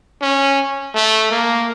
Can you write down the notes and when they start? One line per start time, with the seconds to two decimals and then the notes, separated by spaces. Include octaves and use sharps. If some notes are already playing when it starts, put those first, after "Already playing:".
0.21 C#4
0.94 A3
1.31 A#3